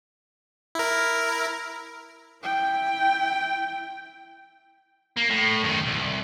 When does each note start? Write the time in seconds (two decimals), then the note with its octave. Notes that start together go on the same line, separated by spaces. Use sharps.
0.75 E4 A#4
2.44 E4 G5
5.17 A#3
5.30 A2
5.64 F#2 D#3
5.87 C2